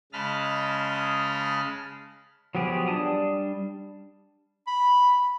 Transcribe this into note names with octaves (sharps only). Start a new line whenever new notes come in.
C#3 G#3 D#5 A5 B5 F6
F3 F#3 B3 G4 G#4
G3 D4 A5 D#6
B5